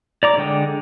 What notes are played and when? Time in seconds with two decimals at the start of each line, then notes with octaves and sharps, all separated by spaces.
0.23 D5 A#5 D6
0.38 D3 G#3 G5